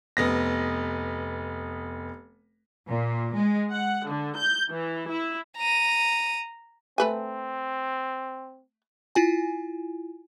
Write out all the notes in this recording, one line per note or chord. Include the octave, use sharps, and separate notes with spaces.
F1 B3 A#6
A#2
G#3
F#5
D3
G6
E3
E4
A#5 D#7
A3 C4 B4 G#5
E4 F4 G#5